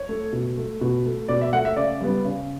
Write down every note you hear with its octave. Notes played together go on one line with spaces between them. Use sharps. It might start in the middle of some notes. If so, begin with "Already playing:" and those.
Already playing: C#5
A3
B2
A3
B2
A3
B2 D5
E5
A3 F#5
E5
C#3 D5
G3 B3
C#3